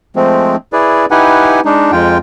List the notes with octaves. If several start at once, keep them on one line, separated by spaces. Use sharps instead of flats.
F3 G#3 A3 C4
E4 G#4 B4 D5
D#4 E4 G4 B4 F#5 G#5
G#3 D4 D#4
F2 G#3 F4 G5